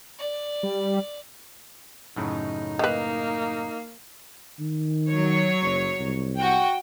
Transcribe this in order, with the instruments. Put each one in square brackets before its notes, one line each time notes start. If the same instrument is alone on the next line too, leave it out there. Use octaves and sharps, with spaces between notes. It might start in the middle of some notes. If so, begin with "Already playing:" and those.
[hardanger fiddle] D5
[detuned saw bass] G3
[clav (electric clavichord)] F#2 A2 C#3 [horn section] D#4
[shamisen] D#3 B4 [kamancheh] A#3
[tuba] D#3
[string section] F#3 C#5
[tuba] F#1
C2
[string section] F#4 G5